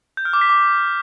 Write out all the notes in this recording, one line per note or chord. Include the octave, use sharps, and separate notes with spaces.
G6
F6
D6
B6
D6